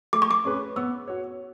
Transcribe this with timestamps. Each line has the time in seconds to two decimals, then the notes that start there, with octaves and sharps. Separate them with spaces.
0.13 A3 D6
0.22 C#6
0.31 D6
0.45 C#4 G#4 B4
0.76 B3 E6
1.08 F#4 C#5